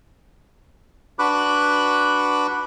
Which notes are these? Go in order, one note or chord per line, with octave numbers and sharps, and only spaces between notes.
D4 F#4 B4 B5 D6 F#6